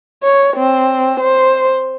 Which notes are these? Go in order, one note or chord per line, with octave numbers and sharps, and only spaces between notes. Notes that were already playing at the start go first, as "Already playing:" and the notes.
C#5
C4
C5